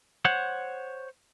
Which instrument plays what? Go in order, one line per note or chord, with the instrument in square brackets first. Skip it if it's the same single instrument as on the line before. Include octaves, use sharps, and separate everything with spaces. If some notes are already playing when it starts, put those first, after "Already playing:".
[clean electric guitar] C5 C#5 F#5